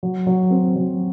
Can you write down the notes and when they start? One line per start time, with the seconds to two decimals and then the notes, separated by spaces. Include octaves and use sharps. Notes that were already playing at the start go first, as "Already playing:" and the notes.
0.03 F#3
0.27 F#3
0.50 C4
0.76 F#3